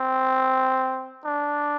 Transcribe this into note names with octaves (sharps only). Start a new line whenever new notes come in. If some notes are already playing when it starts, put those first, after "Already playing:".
Already playing: C4
D4